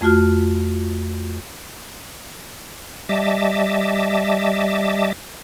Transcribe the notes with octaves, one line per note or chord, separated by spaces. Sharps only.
F2 A3 F4 F#4 F6
G3 D#5 E5 A5 D6